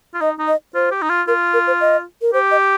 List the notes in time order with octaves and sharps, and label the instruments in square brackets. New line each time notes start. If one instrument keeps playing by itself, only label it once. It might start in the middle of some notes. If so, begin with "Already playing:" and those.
[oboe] F4
[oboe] D#4 [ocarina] D#5
[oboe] D#4
[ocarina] D#5
[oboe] F4 [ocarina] C5
[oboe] G4
D#4
F4
[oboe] F4 [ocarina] A#4
[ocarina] A#4
C5
D#5
A#4
[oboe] G4 [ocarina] C5
[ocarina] D#5